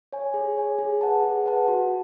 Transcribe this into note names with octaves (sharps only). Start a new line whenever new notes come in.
C#5 G#5
G#4
C#5 G#5
G#4
B4 F#5 A5
G#4
B4 F#5 A5
F#4